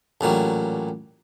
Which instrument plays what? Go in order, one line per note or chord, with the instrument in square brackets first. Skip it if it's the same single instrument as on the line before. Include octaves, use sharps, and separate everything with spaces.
[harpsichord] A1 A#2 F#3 G3